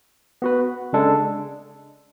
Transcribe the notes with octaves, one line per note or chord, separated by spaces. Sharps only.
B3 F#4 B4
C#3 G#3 D4 A4